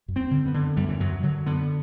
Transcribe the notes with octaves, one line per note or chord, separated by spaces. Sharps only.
F#2
C4
D3
B3
D3
F#2 G3
E3
F#2 F#3
D3 F#3
D3 B3